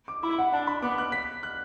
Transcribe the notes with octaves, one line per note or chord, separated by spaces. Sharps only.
D6
E4 B5
F#5
D4 A5
B5
B3 D6
F#6
B6
F#6